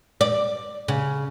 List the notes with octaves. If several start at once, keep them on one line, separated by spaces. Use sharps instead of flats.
D5
C#3